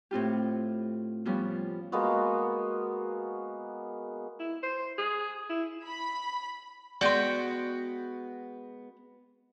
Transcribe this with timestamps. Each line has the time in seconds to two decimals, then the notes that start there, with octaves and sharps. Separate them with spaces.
0.11 A2 C4 F4 G4
1.25 F3 G3 B3 C#4
1.92 G#3 A#3 B3 F#4
4.40 E4
4.63 C5
4.98 G#4
5.49 E4
5.86 B5
7.01 G#3 B3 F#4 D5 G5 C6